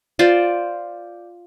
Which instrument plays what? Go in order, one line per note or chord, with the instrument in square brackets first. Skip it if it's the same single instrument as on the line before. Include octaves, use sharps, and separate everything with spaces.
[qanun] F4 C5 D5